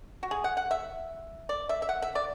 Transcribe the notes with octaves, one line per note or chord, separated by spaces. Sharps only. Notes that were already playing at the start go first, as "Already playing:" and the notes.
F#4
G#4
F#5
F#5
E5
D5
E5
E5
F#5
E5
D5